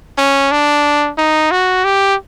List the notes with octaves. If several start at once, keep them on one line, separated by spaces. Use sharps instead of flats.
C#4
D4
D#4
F#4
G4